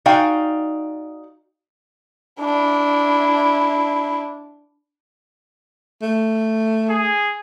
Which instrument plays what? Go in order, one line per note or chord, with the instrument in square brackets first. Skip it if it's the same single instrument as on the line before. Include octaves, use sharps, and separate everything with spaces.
[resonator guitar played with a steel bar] D#4 F#4 D5 F5 G5 G#5
[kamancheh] D4 E4
[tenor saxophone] A3
[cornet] G#4